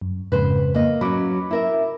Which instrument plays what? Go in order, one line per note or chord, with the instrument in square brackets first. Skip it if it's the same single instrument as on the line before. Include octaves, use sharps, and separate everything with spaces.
[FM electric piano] F#2
[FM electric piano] F2 G#2 C#3 [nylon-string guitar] B4 C5
[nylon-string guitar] A#3 D#5
[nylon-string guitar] F#3 C#4 [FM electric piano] B5 D6
[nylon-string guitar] E4 A#4 E5